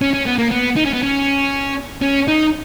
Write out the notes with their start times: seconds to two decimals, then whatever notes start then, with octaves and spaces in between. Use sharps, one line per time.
0.01 C#4
0.14 C#4
0.26 B3
0.39 A#3
0.51 B3
0.76 D#4
0.85 C#4
0.93 B3
1.03 C#4
2.02 C#4
2.28 D#4